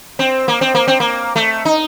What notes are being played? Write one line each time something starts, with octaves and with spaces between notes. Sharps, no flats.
C4
A#3
C4
A#3
C4
A#3
A3
D#4